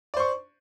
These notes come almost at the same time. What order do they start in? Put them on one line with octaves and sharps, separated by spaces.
D5 C5 C#6